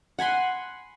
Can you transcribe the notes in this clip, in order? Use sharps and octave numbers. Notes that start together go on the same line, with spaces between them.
F#5 G#5 B5 C6